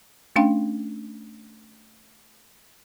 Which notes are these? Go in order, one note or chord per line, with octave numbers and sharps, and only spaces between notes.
A3 C#4 D4 F5 G5